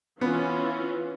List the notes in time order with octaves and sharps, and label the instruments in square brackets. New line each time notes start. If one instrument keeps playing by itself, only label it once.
[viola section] E3 C#4 F4 [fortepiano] B3